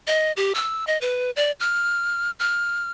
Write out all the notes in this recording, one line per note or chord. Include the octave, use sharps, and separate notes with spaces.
D#5
G4
E6
D#5
B4
D5
F6
F6